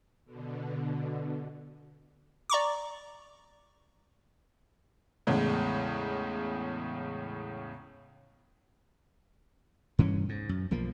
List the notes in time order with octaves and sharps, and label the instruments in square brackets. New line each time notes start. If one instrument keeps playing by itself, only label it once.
[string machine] B2 D3
[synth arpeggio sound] D5 A#5 C#6 D6
[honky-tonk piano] E2 A2 C#3 G#3
[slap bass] G2 E3 C#4
G#2
F#2
B1 F3 A#3